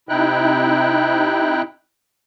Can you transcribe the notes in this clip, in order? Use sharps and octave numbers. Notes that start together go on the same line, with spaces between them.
C3 D#4 E4 G5 F#6